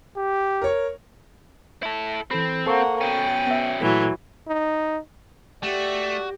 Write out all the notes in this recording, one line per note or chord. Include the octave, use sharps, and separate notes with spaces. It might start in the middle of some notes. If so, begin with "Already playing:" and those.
G4
A#4 C#5
E4 A4
E3 C4 A4 B5
A#3 A4 C5 F#5 C#6
B2 C#4 G5
B3 E5
A#2 E3 F#3 A3 A4
D#4
A3 F#4 G4 D5